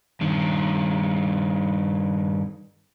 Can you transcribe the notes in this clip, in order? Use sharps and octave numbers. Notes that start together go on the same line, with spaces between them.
G2 D#3